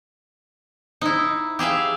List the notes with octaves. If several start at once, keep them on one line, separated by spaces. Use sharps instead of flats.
D#4 E4
G4 G#4 E5 F5